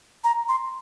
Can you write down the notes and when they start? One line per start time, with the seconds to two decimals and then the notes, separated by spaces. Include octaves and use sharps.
0.24 A#5
0.49 C6